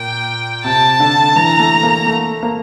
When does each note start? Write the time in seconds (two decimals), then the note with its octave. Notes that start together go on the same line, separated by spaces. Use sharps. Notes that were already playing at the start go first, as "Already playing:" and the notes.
Already playing: A#2 G5
0.64 C3 A5
1.00 D3
1.36 E3 A#5
1.59 A3
1.83 A#3
2.07 A3
2.43 A#3